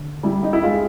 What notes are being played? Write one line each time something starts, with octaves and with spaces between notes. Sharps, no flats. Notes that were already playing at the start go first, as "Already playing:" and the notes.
Already playing: D3
G3 E4
D#4
E4
G#3 F4